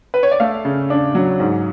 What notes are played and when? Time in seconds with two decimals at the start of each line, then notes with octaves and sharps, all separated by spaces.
0.14 B4
0.23 C#5
0.31 D5
0.40 A3 F5
0.65 C#3
0.90 D4
1.15 F#3
1.40 G#2